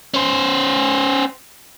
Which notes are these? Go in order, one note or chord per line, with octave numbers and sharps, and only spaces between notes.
C#4 C5